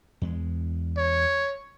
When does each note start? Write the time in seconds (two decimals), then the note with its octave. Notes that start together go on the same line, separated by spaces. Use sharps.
0.22 E2 G#3
0.97 C#5